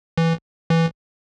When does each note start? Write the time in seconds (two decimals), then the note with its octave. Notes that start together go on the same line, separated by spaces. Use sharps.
0.18 E3
0.70 E3